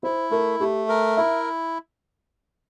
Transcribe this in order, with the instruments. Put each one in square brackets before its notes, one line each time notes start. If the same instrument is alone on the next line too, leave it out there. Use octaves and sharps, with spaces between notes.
[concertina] E4 [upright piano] C5
[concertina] A3 [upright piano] A#4
[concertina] A3 [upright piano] G4
[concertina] A#4
[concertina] E4 [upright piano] E5